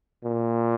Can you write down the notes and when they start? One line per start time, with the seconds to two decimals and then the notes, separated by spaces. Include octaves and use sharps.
0.24 A#2